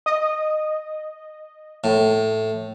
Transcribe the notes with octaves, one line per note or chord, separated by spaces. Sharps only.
D#5
A2